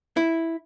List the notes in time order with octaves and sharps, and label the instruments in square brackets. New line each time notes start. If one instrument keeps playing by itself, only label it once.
[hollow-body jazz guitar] E4